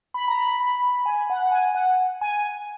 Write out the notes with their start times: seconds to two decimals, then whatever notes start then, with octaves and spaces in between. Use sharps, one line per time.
0.14 B5
0.28 A#5
0.38 B5
0.60 B5
1.06 G#5
1.30 F#5
1.46 F#5
1.52 G#5
1.75 F#5
2.21 G#5